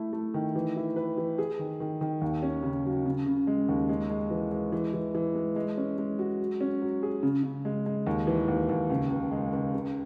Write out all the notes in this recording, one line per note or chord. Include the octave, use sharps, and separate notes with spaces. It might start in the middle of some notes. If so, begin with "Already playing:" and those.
Already playing: A3 E4
A3
D#3
E3
E4
B4
E3
G#4
D#3
D#3
D#3
D#2
C#4
C#3
F#3
C#3
C#3
G#3
D#2
G#3
G#3
E3
G#3
E3
E3
E3
G#3
G#3
C#4
G#3
F#4
F#3
C#4
F#3
G#4
C#3
C#3
G#3
G#3
D#2
E3
D#2
D#2
C#2
C#2
G#3
C#2
C#3